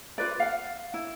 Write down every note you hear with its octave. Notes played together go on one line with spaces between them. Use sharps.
F4 B4 D5
F5 F#5
E4